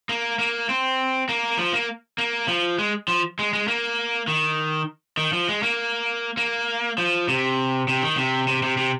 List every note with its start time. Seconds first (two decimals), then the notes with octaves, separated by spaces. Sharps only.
0.09 A#3
0.39 A#3
0.69 C4
1.29 A#3
1.58 F3
1.73 A#3
2.18 A#3
2.48 F3
2.78 G#3
3.08 F3
3.39 G#3
3.53 G#3
3.68 A#3
4.28 D#3
5.17 D#3
5.33 F3
5.49 G#3
5.63 A#3
6.37 A#3
6.98 F3
7.28 C3
7.88 C3
8.02 D#3
8.17 C3
8.48 C3
8.63 C3
8.77 C3